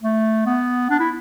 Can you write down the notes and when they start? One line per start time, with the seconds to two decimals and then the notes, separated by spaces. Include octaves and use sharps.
0.02 A3
0.46 B3
0.90 D4
1.00 E4